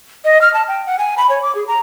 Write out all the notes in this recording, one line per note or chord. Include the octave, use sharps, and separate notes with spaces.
D#5
F6
A5
G5
F#5
G#5
B5
C#5
D6
G#4
A#5